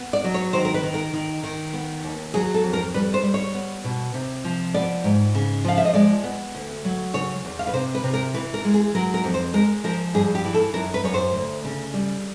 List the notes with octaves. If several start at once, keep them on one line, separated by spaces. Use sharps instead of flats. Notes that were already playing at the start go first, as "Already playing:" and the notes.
Already playing: B3
D5
F#3
C#5
D#3 C5
A#4
B4
D#3
A#4
D#3
D#3
B3
D#2
F#3 G#4
A4
F2
A#4
G3 B4
C5
G3
C#5
B3
B2
C3
F3
B3 D5
G#2
C#3
F3 F5
E5
D#5
G#3 D5
B3
D2
F#3
C#3 C#5
E2
F5
B4
C3 C5
B4
C3
A#4
E3 B4
A#4
G#3
G#4
F#3 A#4
A#4
F2
C5
G#3 A#4
F3 A#4
G2 G#4
G4
E3
A4
F#2 A#4
B4
F#2 C#5
C5
D2
C#3
G3